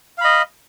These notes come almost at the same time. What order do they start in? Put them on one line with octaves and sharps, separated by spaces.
F5 B5 D#5